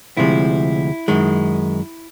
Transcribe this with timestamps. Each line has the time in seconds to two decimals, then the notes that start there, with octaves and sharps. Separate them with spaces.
0.17 D2 C3 F3 G#3 E4
1.08 F#2 D#3 G#3